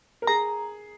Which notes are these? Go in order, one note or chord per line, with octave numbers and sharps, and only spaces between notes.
A#4
G#4 A#5